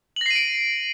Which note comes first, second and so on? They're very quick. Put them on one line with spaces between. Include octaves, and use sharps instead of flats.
F#7 A#6 C7 D#7 D7